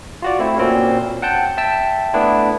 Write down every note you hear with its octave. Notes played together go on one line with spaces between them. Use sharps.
F4 F#4 D5
A3 C4 E4
A#2 C4 C#4 F#4
F#5 G5 A5 G6
E5 G5 A5 E6
A3 B3 D4 E4